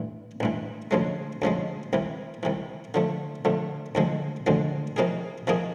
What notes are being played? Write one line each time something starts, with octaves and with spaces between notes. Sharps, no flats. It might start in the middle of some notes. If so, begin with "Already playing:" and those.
Already playing: A1 G2 E3
A1 G2 E3
D2 C#3 F3 G#3
D2 C#3 F3 G#3
C2 C3 E3
C2 C3 E3
D3 F3 A3
D3 F3 A3
D2 D3 F3 G#3
D2 D3 F3 G#3
C3 F3 A#3 D#4 G#4
C3 F3 A#3 D#4 G#4